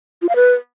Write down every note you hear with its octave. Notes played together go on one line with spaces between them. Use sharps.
F4
F5
B4